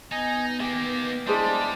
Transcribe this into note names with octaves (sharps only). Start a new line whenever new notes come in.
B3 D#4 D#5 G#5
D#3 A#3 G4 G#5
G3 G#3 D4 E4 G#4 C5